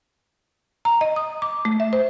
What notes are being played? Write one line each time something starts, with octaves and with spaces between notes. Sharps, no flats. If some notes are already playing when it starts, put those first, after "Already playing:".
A#5
D#5
D#6
D6
A3
E5
C5